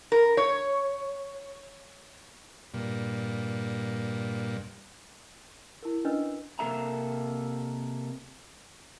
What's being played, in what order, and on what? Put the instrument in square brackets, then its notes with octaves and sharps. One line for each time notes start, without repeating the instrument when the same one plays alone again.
[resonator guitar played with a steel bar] A#4
C#5
[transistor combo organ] G2 A#2
[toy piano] E4 A#4
C#4 D4 B4 D#5 E6
[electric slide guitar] C3 A#3 A4 E5 A#5